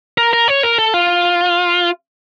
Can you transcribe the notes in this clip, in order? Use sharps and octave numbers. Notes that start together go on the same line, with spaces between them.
A#4
A#4
C#5
A#4
A4
F4